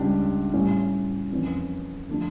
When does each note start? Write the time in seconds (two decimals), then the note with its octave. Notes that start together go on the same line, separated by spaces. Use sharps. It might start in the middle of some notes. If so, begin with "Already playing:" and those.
Already playing: C#2 C#3 G3 D4 G4
0.53 A2 G3 C#4 E4
1.32 F2 E3 A#3 C#4
2.09 D3 F3 A3 D4